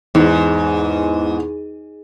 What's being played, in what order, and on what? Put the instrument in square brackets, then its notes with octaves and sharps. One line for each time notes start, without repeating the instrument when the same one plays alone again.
[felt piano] E2 [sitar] G#2